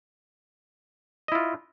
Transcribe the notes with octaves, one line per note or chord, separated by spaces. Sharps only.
E4 F4 D#5